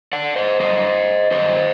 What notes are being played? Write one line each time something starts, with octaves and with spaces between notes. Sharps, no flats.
D5 F#5
C5 D#5
F#2 D3 G3 C5 D#5
G2 D#3 F#3 C5 D#5